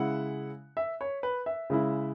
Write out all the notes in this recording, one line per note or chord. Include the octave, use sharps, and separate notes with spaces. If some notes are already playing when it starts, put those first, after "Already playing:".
Already playing: C#3 G#3 E4 F#5
E5
C#5
B4
E5
C#3 G#3 E4